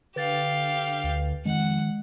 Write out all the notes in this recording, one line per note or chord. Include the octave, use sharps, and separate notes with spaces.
D3 G4 B4 F5 A6
D2
F2 D#3 G#3 F#5